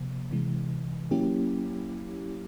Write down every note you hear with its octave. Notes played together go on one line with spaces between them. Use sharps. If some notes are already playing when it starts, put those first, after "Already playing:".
Already playing: C3 F3 A#3
C3 E3 G#3
F#3 A#3 C#4 E4 G4